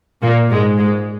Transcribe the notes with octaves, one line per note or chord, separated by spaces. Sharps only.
A#2 A#3
G#2 G#3
G#2 G#3